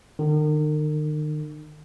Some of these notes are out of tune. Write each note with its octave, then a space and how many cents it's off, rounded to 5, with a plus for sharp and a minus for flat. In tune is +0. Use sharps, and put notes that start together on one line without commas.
D#3 -40